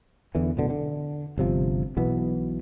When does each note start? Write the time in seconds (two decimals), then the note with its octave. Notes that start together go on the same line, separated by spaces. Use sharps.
0.35 E2 D3 E3
0.57 D1 B2 D3
0.70 D3
1.38 G1 C3 F3
1.97 B1 B2 E3 B3